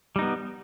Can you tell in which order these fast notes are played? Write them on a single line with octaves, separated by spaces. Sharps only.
G3 D#4 B3